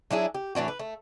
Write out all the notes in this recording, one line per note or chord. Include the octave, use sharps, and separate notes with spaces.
F#3 D4 E4 G#4
G4
A2 E3 D4 F#4
B4
A3